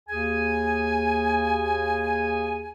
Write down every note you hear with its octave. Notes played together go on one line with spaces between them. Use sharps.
D#2 G#4 G#5